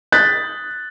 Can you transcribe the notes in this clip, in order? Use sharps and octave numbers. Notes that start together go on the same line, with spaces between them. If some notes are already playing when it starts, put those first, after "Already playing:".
D#6 F#6 G6 A6 B6